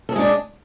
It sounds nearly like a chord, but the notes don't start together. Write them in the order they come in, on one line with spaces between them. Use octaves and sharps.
A4 G#4 G#3 D4